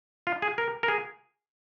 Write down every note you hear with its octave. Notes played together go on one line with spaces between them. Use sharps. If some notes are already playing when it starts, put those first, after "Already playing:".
F4
G#4
A#4
A#4
G#4